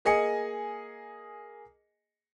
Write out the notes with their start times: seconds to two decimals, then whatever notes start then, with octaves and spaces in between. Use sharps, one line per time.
0.05 A#3 G#4 D#5 G#5 C#7